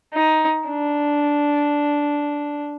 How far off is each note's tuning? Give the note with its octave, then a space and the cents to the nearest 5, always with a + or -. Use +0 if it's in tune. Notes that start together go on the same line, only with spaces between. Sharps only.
D#4 +10
D4 -5